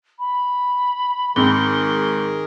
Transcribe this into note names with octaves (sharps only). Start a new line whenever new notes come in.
B5
G#2 D#3 C4 G#4 A#4 G7